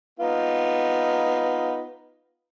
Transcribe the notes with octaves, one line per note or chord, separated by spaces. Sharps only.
B3 D#4 F4